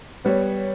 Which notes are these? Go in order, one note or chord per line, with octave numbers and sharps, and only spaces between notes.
G3 B3 C#5